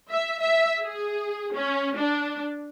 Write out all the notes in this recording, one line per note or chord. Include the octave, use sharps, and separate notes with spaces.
E5
E5
G#4
C#4
D4